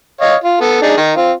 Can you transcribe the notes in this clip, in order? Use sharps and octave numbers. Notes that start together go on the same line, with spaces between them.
C#5 D#5 F5
F4
B3 A4
D4 D#4 G#4
D#3 D#4
C4 F4